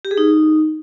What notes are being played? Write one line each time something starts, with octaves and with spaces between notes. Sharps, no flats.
G4
G#4
D#4